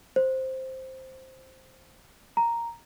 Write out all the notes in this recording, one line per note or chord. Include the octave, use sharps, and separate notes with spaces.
C5
A#5